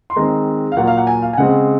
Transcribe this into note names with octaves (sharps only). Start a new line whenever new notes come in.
C6
D#3 G#3 C4 A#5
F5
A#2 F#3 A#3 F#5
F5
F#5
G#5
F5
G#5
C#3 G#3 C4 F#5